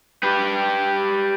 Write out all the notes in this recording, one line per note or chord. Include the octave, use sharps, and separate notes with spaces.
G4 B4